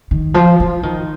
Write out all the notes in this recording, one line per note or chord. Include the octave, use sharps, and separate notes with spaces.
D#3
F3
F3
D#3